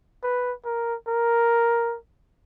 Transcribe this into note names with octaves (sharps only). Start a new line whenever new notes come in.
B4
A#4
A#4